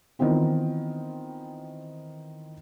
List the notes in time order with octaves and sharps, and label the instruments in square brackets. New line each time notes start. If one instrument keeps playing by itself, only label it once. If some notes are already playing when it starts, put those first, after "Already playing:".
[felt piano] D#3 E3 B3 C4 F4